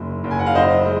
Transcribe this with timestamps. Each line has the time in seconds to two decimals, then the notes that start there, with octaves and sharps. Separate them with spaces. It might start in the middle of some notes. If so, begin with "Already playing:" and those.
Already playing: F#1 F#2
0.24 F#1
0.31 G#5
0.39 F#5
0.46 F5
0.54 F#2 C5 D#5
0.85 G#3